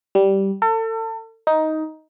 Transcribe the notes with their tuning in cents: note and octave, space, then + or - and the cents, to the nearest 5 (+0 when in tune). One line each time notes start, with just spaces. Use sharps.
G3 -10
A4 +35
D#4 +10